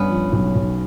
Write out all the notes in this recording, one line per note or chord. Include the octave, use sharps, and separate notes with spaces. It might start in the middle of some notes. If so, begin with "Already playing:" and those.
Already playing: G2 B3 C#4
F3
B1
B1